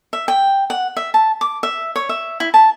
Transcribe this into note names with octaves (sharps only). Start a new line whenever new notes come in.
E5
G5
F#5
E5
A5
D6
E5
C#5
E5
E4
A5